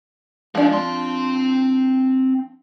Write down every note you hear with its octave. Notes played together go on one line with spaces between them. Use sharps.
F3 G#3 D4
C4 C6